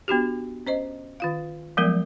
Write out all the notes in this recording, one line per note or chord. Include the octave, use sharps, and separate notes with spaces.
B3 D4 F#4 G4
C#4 C5 D#5
D#3 F4 F5
F3 F#3 G#3 A3 B3 A#4